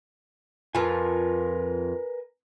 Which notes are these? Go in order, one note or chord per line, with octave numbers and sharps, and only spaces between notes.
F2 F4 A#4 B4 G#5